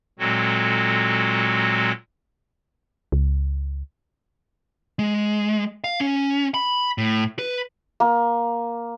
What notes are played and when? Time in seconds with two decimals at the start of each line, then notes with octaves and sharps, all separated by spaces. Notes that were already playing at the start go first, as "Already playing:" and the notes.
0.19 A#2 F#3 G#3 C4 F#4 A4
3.12 C#2
4.99 G#3
5.84 F5
6.00 C#4
6.54 B5
6.98 A2
7.39 B4
8.00 A#3